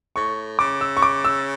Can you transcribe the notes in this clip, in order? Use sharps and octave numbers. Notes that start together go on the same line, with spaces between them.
A2 C#6
C#3 D6
E6
C#6
D6
E6